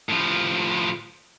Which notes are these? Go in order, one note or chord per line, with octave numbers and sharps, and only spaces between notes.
A2 F3